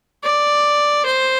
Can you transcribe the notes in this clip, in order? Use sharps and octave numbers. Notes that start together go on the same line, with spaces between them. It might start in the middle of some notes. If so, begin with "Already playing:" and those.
D5
C5